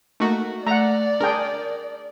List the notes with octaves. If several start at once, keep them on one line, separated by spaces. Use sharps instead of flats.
A3 A#3 D#4 F#4
A3 D5 F#5 A#5
D4 G#4 A#4 G5